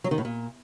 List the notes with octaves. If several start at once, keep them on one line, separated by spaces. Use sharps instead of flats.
F#3
D#3
A2
A#2